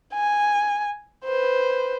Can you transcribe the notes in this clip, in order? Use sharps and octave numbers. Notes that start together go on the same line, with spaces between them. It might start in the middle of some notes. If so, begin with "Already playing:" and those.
G#5
B4 C5